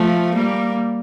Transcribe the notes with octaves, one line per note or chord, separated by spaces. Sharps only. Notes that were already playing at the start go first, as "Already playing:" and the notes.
Already playing: F3 A3
G3 A#3